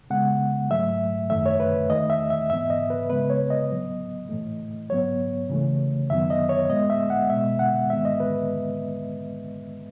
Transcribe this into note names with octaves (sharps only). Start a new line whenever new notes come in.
C#3 G#3 B3 F#5
G#2 F#3 A3 E5
F#2 D#3 A3 E5
C#5
B4
E2 D#3 A3 D#5
E5
E5
G#2 E3 B3 E5
D#5
B4
C#3 G#3 B3 B4
C#5
D#5
A2 F#3 B3
A2 E3 A3
G#2 F#3 B3 C#5
C#3 E3 A3
F#2 D#3 F#3 B3 E5
D#5
C#5
A2 G#3 B3 D#5
E5
F#5
B2 G#3 B3 E5
F#5
G#2 D#3 G#3 B3 E5
D#5
B4